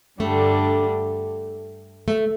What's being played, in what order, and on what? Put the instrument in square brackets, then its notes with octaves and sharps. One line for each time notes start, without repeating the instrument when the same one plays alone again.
[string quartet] G2 D3 G3 D4 [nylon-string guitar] A3
[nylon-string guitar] A3